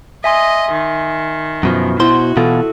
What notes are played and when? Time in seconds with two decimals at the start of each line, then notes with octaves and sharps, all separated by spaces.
0.24 D#5 E5 G#5 C6
0.72 D#3
1.63 F#2 B2 F3
2.00 B2 E4 F#4 C5 C6
2.37 B2 E3 F4 A4